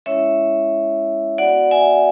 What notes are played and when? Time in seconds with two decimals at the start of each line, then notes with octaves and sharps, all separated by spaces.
0.06 G#3 C#4 E4 C#5 E5
1.38 B3 F#4 D5 F#5
1.71 E5 G#5